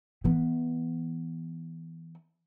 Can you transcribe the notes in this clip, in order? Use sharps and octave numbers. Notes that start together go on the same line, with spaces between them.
E3 B3